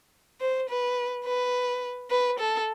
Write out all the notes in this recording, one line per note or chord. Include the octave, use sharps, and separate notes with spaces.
C5
B4
B4
B4
A4